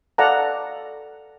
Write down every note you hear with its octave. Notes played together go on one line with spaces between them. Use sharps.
A4 D5 F5 F#5 A5 A#5